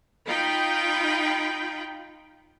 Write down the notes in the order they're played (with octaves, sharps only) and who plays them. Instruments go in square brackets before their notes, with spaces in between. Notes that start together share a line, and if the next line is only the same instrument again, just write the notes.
[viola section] D#4 F4 G5 B5